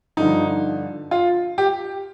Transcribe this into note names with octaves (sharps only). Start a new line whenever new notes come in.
G2 D3 F3 D#4
F4
G4